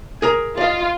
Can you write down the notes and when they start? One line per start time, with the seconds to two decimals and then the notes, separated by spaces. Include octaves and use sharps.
0.22 G#4 A#4 A#5
0.57 F4 D5 D#5